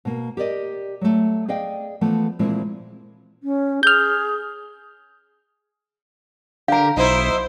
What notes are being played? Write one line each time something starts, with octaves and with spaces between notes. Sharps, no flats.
B2 A#3
G4 A#4 D5 D#5
F#3 A3
G#4 D5 D#5 F5 G5
E3 F3 A3 B3
A#2 E3 F3 G#3 C4 E4
C#4
G#4 F6 G6
D3 G4 A#4 F5 A#5
B1 D#4 E4 C5